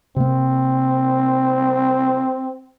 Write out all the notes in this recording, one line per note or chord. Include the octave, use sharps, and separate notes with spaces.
C3 A#3 C4